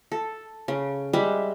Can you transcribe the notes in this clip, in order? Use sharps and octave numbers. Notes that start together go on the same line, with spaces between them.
A4
C#3
G3 G#3 E5